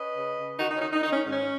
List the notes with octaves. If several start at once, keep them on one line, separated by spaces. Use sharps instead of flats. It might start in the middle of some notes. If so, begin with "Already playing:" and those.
Already playing: C#4 B4 D#5
C#3
C#3
D#3 D#4 F#4
D#4
C#4
D#3 D#4
D#4
D#3 D#4
C#4
G#2
C#4